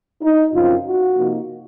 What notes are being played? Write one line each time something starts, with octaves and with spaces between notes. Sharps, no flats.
D#4
F#2 C#3 F3 C4 F4
F#4
C3 F3 A#3 D#4